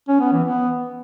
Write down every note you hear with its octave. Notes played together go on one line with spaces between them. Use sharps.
C#4
B3
E3
B3